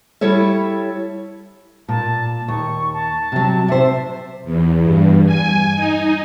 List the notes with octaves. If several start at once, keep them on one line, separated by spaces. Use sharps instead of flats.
G3 E4 A4 C#5 E5
A#2 A5
D#2 C#6
A5
C3 F#3
C3 C5 E5
E2
G2
G#5
D#4